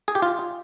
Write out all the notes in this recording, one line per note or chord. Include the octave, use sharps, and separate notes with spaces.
G#4
G4
F4